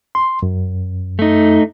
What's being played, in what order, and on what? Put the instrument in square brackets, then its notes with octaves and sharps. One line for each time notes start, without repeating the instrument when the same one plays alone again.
[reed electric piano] C6
F#2
[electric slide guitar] A3 D#4